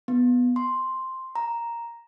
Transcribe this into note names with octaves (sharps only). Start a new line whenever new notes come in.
B3
C6
A#5